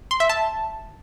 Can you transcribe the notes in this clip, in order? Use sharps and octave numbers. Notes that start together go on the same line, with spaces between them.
C6
E5
A5